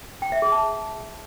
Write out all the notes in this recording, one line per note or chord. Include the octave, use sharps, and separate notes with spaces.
G5
E5
G#4
A5